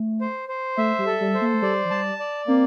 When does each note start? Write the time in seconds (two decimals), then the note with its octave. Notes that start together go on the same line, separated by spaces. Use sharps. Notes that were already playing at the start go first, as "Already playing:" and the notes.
Already playing: A3
0.21 C5
0.49 C5
0.77 A3 E5
0.99 G3
1.06 A4
1.21 G3
1.34 C5
1.42 A#3
1.54 A3
1.62 G3 D5
1.85 F3
1.91 G3 A5
2.20 D5
2.47 A#3 C4